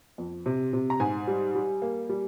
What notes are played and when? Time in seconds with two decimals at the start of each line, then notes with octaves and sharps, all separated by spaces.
0.18 F2
0.46 C3
0.73 C3
0.90 A#5
1.00 G#2 G#5
1.27 G3
1.55 G3
1.82 A#3
2.09 G3